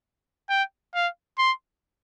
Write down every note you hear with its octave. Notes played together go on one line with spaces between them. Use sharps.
G5
F5
C6